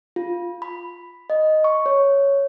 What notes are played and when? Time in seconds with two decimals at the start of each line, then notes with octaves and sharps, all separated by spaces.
0.16 F4
0.62 B5
1.30 D#5
1.64 C#6
1.86 C#5